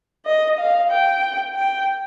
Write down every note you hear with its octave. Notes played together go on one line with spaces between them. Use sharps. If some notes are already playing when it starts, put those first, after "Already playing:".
D#5
F5
G5
G5